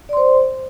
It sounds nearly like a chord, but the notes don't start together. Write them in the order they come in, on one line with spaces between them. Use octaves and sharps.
D5 C6 C5